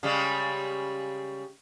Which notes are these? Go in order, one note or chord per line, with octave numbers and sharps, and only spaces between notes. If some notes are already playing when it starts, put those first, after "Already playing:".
C#3 G3 G#3